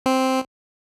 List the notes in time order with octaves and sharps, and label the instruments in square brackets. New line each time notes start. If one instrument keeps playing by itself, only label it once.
[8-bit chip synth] C4